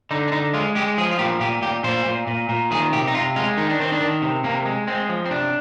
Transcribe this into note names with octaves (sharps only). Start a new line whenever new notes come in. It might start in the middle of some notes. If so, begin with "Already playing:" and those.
D3 D#4
D4
D3 D#4
G#3 F4
G#3 G4
F3 G#4
F4
A#2 G4
A#2 G4
A#2 G4
A#2 C5
A#2
A#2
A#2
D#3 G#4
C3 G4
D#4
C3 F4
G#3 F4
D#3 D#4
D4
D#3 C4
D4
D#3
C3
C3 A#3
G#3
G#3 C4
F3
C4
C3 D4